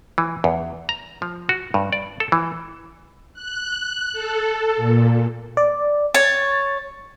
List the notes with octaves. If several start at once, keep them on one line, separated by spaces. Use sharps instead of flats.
E3
E2
A#5
F3
F#4
G2
D5
A4
E3
F#6
A4
A#2
D5
C#5 A6